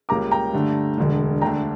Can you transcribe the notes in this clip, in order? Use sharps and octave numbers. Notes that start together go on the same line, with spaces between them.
C#2 C#3 G3 A#3 A#5 D6
G5 A#5
G2 D3 A3 D4
E1 D2 D3
D2 D3 A3 D4 G5 A#5